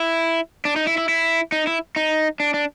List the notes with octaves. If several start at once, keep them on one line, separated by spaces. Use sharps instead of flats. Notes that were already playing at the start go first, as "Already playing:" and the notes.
Already playing: E4
D4
D#4
E4
E4
E4
D#4
E4
D#4
D4
D4